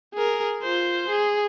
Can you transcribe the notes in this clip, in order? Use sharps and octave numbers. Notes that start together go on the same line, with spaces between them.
G#4 A#4
F4 C5
G#4